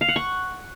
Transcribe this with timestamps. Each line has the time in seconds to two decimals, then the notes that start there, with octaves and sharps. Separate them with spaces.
0.01 F5
0.08 F#5
0.16 C#6